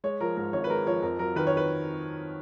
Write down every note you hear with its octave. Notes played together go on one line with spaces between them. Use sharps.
G#3 C#5
F3 A#4
G#2 A#4
G#1 C#5
B4
G#3 A#4
F3 C#5
F2 A#4
F#3 A#4
D#3 B4
C#5
B4